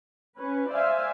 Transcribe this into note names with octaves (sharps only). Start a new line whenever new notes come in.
C#4 B4
C5 D5 E5 F5 G#5